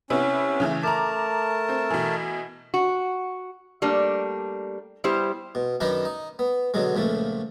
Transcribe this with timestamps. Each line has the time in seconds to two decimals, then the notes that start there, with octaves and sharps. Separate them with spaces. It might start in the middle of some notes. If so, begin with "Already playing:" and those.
0.10 C3 B3 C#4 E4
0.60 C#3 E3 A3
0.83 A3 A#4 A5 A#5 D6
1.69 C4
1.90 B2 E3
2.74 F#4
3.82 G3 A3 A#3 D4
5.04 G3 B3 E4 G4 C5
5.55 B2
5.80 F#2 D#3 D4 D#4 B4 D#5
6.05 D#4
6.39 B3
6.74 B2 D3 F#3 G#3
6.95 C#2 A#2 F3 A3